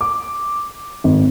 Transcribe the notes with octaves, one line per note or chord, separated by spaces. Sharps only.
D6
G#1